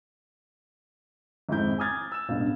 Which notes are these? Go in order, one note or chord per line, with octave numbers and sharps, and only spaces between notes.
G#1 F2 G#2 E4 G6
G#5 D6 D#6 F6 G#6 A6
E6 E7
E1 A1 G2 B3 F5